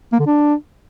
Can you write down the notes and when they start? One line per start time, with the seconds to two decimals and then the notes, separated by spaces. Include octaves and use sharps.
0.12 A#3
0.19 D3
0.26 D4